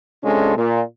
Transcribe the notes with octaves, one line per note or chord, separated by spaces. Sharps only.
C3 G#3 C#4 D4 F4 A4
A#2